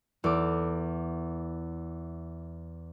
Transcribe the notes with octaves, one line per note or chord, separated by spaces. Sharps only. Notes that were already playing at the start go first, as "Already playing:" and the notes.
E2 A4 D6